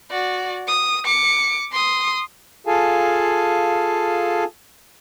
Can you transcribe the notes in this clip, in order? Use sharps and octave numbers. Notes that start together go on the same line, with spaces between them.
F#4 D5
D#6
D6 C#7
C6 D#6
F4 G#4 A4 F5 G#5 A5